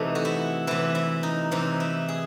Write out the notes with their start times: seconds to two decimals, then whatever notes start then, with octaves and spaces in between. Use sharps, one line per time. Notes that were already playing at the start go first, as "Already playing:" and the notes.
Already playing: C3 E3 A3 D#4
0.15 F#4
0.25 E4
0.67 C3 E3 E4
0.95 E4
1.23 D#4
1.51 C3 E3 D#4
1.80 E4
2.08 G#4